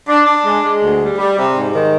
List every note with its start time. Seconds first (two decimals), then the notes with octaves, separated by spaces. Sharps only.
0.08 D4
0.27 D4
0.44 G#3
0.63 G#3
0.82 D2
1.00 G3
1.18 G3
1.37 C3
1.55 G#2
1.74 D#3